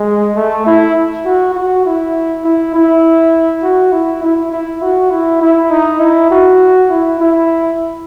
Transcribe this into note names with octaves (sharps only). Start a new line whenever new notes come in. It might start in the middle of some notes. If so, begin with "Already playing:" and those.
Already playing: G#3
A3
E4
F#4
F#4
E4
E4
E4
F#4
E4
E4
E4
F#4
E4
E4
D#4
E4
F#4
E4
E4